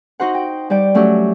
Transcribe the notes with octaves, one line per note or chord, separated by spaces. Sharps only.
D#4 F#4 C5 F#5
G5
G3 D5 G5
F#3 A3 C#4 F#4 G4